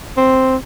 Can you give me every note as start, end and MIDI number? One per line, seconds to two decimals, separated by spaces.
0.17 0.56 60